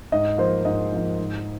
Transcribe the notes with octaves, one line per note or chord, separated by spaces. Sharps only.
G#2 D#5
F3 A#3 C5
G#2 D#5
F3 A#3
G#2